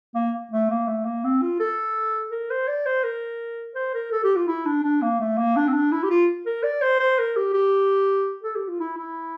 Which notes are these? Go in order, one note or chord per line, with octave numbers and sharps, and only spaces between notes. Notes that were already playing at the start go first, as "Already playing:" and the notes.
A#3
A3
A#3
A3
A#3
C4
F4
A4
A#4
C5
D5
C5
A#4
C5
A#4
A4
G4
F4
E4
D4
D4
A#3
A3
A#3
D4
C4
D4
E4
G4
F4
A#4
D5
C5
C5
A#4
G4
G4
A4
G4
F4
E4
E4